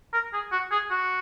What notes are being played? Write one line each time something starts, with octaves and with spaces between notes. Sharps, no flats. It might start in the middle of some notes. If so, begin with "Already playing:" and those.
A#4
G#4
F#4
G#4
F#4